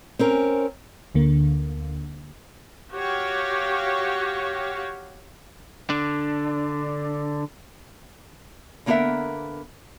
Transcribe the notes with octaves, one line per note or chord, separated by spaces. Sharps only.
C4 C#4 A#4
D2 D3 A#3
F#4 G4 C#5 F5
D3 D4
D3 A#3 B3 G4 A#4 E5